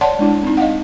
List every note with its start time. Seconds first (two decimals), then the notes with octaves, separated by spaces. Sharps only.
0.01 C#5 D5 F#5 A5 C6
0.19 G#3 D4 E4
0.43 C4 D#4
0.57 D#5 F5 F#5